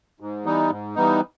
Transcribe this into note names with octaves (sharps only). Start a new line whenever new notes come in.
G#2
E3 G3 B3 D#4
G#2
E3 G3 B3 D#4